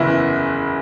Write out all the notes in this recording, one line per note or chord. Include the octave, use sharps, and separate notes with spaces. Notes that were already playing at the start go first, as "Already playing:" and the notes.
Already playing: F#1 E2 C#3 E3 E4